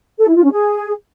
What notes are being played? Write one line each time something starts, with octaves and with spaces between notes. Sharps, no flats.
A4
E4
F4
C#4
G#4